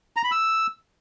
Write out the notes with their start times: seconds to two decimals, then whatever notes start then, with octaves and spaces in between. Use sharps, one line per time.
0.16 A#5
0.24 B5
0.32 E6